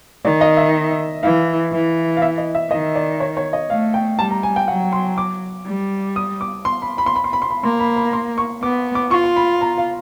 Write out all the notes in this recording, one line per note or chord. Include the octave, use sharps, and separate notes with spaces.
D#3 D5
D#5
E5
E3 F5
E3
F5
E5
D#5
E5
D#3 D#5
D5
C#5
C#5
D#5
A3 F5
G5
G3 A5
A#5
G#5
G5
F#3 F#5
C6
D6
G3
D#6
D6
C6
B5
B5
C6
B5
C6
B5
C6
B5
A#3 C6
B5
B5
C6
C#6
B3 D6
D6
F4 C#6
C6
B5
A#5
F5